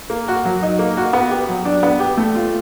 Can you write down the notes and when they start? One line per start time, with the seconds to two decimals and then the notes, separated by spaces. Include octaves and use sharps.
0.10 A#3
0.28 F#4
0.45 F#3
0.63 D#4
0.79 A#3
0.97 F#4
1.13 B3
1.31 G4
1.49 F#3
1.65 D4
1.83 B3
2.00 G4
2.18 A3
2.35 F4